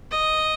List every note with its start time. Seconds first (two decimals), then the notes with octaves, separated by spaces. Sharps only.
0.11 D#5